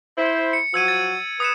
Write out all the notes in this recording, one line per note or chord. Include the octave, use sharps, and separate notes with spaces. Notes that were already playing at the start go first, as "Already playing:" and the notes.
E4 C5
C#7
F3 F#3 F#4 E6 G#6 D#7
A6
B4 D#6 C#7 E7